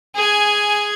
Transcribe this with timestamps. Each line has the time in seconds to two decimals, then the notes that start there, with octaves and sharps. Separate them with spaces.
0.15 G#4 G#5